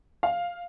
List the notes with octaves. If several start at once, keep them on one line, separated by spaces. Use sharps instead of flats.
F5